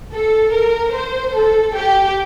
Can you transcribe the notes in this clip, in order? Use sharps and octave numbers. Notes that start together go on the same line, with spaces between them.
A4
A#4
C5
A4
G4